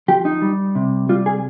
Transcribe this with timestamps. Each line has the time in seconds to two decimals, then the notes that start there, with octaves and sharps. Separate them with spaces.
0.08 F3 G4
0.25 D#4
0.42 G3
0.75 C3
1.09 G3 F4
1.26 G#4